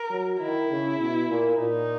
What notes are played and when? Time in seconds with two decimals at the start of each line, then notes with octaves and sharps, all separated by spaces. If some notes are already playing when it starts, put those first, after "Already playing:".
Already playing: A#4
0.11 F#3
0.40 D#3 E4
0.70 C#3
0.99 B2
1.28 A#2
1.58 A#2 D#4